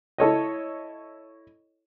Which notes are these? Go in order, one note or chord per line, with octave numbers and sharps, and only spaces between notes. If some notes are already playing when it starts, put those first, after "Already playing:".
E4 A4 C#5 D#5